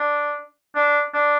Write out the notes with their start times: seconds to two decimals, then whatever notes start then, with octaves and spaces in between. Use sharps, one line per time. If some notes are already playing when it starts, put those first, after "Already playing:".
Already playing: D4
0.75 D4
1.14 D4